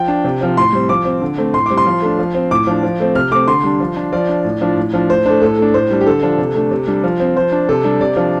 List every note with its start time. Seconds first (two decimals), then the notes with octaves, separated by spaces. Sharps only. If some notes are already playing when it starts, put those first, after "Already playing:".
Already playing: F3 G5
0.08 D4
0.24 C3
0.41 F3 C4
0.57 A2 C6
0.73 G3 C4
0.89 F3 D6
1.05 C4
1.22 D3
1.38 A3 C4
1.54 A2 C6
1.66 G3 C4 D6
1.77 C6
1.86 F3
2.02 A3 D4
2.19 F3
2.35 C4
2.51 A2 D6
2.67 F3 D4
2.83 F3
3.00 A3 C4
3.15 C3 F6
3.31 A3 C4 D6
3.48 D3 C6
3.64 G3 D4
3.80 F3
3.96 D4
4.12 F3 D5
4.29 D4
4.45 A2
4.61 F3 D4
4.77 A2
4.93 F3 D4
5.10 A2 C5
5.26 A3 D4 C5
5.42 A2 A4
5.58 A3 D4
5.74 A2 C5
5.91 G3 D4
6.01 G4
6.06 D3 A4
6.23 F3 D4
6.38 C3
6.55 A3 D4
6.71 C3
6.87 G3 D4
7.04 F3
7.20 C4
7.36 F3 C5
7.52 D4
7.69 C3 A4
7.84 G3 D4
8.01 C3 D5
8.17 F3 D4